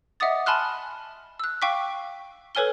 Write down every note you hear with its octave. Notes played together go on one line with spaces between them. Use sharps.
D#5 E5 F#5 D6 D#6 A6
G#5 A5 B5 C6 F6 F#6
E6 F#6
F5 G5 C#6 D6 B6
A4 B4 C#5 G#5 F6 G7